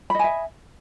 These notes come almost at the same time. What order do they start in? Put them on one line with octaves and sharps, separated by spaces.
B5 D#5 G#5 E5